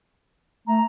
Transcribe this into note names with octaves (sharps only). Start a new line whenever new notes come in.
A3 A#5